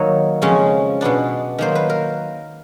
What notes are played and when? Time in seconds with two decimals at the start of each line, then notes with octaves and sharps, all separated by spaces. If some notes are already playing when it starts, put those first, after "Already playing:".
Already playing: D#3 F#3 A#3 C#5
0.42 F2 C#3 F3 G#3 C#4
1.01 B2 G#3 B3 D4
1.58 D#3 F#3 A#3 C5
1.75 B4
1.90 A#4